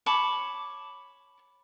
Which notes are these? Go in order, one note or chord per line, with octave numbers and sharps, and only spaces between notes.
C#5 A5 B5 D6